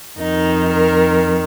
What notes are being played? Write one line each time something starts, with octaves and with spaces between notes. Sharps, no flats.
F2 D#3 D#4
A#4